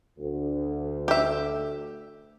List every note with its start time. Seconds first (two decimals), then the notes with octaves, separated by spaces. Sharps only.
0.18 D2
1.08 G4 E5